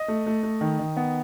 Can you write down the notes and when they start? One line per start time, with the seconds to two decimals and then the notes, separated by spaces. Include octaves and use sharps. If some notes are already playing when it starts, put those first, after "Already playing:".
Already playing: D#5
0.08 A3
0.26 A3
0.43 A3
0.61 D#3
0.79 D#3
0.97 B3